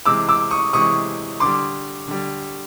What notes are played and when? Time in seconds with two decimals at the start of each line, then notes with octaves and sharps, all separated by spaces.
0.05 C3 E3 G#3 D6 E6
0.29 D6 E6
0.51 C#6 D#6
0.73 C3 E3 G#3 C#6 D#6
1.40 D3 G3 C6 D6
2.08 D3 G3